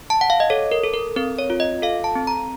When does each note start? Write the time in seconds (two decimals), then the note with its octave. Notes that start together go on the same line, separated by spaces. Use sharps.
0.10 A5
0.21 F#5
0.30 F5
0.40 D#5
0.50 A4 C#5
0.71 A#4
0.84 A4
0.94 A#4
1.16 C4 A#4
1.38 C#5
1.50 F4
1.60 D#5
1.82 A4 F5
2.04 A5
2.15 C4
2.27 A#5